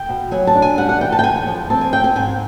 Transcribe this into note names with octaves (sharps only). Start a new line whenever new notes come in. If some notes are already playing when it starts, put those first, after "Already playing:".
Already playing: G5
B2
F#3 G#5
A5
D4
G#5
G3 F#5
F#5
E3 G5
A5
G5
E2 G#5
F3
C4 A5
G#5
C4 G5
G#5
G#2 G#5